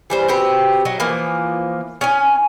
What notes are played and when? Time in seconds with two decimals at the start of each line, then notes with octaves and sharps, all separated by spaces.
0.10 E3 G3 C5
0.28 C4 F#4 G4 B4
0.85 F#3 D#4
1.00 E3 F3 A#3
2.01 C#4 D#4 G#5